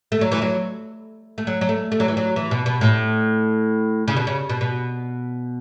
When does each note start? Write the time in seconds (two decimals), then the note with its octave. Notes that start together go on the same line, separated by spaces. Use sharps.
0.12 A3
0.21 F#3
0.32 E3
0.42 F#3
1.38 A3
1.47 F#3
1.61 F#3
1.69 A3
1.92 A3
2.00 F#3
2.08 E3
2.17 F#3
2.36 E3
2.51 B2
2.66 B2
2.81 A2
4.08 C#3
4.16 B2
4.27 C#3
4.49 B2
4.61 B2